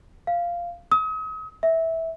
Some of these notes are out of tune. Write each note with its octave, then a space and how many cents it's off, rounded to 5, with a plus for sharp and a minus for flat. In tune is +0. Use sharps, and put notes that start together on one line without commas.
F5 -10
D#6 +40
E5 -15